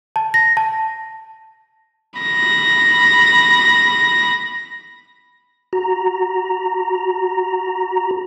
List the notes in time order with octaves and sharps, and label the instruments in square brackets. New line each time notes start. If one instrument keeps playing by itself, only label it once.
[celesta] A5
A#6
A5
[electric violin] B5 A#6
[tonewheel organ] F#4 A#5